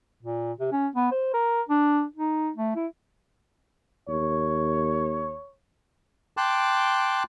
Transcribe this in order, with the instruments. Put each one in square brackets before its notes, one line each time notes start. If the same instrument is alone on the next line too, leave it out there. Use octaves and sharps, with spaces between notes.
[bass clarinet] A#2
C3
C#4
B3
C5
A#4
D4
D#4
A3
E4
[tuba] D#2 [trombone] C#5
[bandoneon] G5 A5 C6 D6 F#6